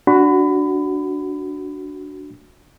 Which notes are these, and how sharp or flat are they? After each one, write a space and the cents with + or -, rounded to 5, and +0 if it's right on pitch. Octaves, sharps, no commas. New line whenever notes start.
D4 -5 F#4 +0 B5 +25